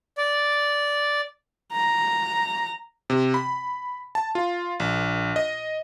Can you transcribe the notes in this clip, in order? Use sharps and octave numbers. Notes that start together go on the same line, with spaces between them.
D5
A#5
C3
B5
A5
F4
A#1
D#5